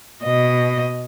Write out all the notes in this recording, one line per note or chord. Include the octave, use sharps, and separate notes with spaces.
B2 D#5